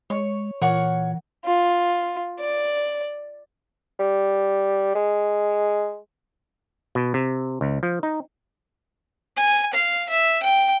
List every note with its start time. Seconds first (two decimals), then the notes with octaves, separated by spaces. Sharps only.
0.10 G#3 C#5
0.62 A#2 E3 A#4 C#5 F#5
1.46 F4
2.40 D5
3.99 G3
4.95 G#3
6.95 B2
7.14 C3
7.61 C#2
7.83 F3
8.03 D#4
9.36 G#5
9.73 F5
10.10 E5
10.43 G5